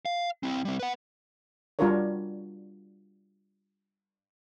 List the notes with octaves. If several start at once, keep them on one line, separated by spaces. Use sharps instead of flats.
F5
C4 E4
G3 C4
B4 F#5
G3 D4 F4 F#4 A#4 C#5